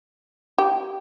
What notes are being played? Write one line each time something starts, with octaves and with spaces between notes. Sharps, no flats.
G4